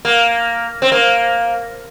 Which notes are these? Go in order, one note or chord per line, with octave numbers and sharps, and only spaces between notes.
A#3
C4
A#3